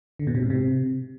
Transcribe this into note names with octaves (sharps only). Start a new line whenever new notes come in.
D3
B2
C3
G#2
C3